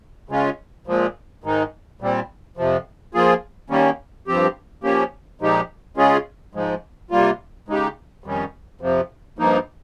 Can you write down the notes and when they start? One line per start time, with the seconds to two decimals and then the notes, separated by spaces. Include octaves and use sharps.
0.29 C#3 G#3 C#4 F4
0.87 A#2 F3 G#3
1.44 G#2 D#3 G#3 D#4
2.01 A#2 G3 C4
2.57 F2 C3 F3
3.14 F3 A#3 F4 G#4
3.70 D#3 G3 A#3 C#4
4.27 G2 F3 C4 G4
4.83 F3 A#3 C#4 G4
5.41 A#2 F3 G#3 D#4 G4
5.97 C#3 G#3 C#4 F4 G#4
6.54 G#2 F3 G#3
7.11 C3 G3 A#3 F4
7.68 C#3 G#3 D#4 G4
8.24 F2 D#3 G3 C#4
8.81 F2 C3 F3
9.39 G2 F3 A#3 D#4